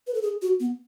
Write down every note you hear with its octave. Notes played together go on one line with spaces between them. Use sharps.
B4
A4
G#4
F#4
B3